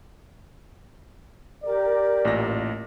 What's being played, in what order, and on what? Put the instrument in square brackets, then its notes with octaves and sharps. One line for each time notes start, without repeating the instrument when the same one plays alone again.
[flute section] G4 A#4 D6 [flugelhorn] D5
[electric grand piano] A1 A#2 A#6